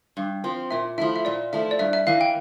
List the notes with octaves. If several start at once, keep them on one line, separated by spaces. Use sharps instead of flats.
G2
F3 C4
A#2 E5
F3 A3 E4 E5
E5
A#2 D5
F3 A3 E4 E5
D5
G2 E5
E5
E3 A#3 F5
G5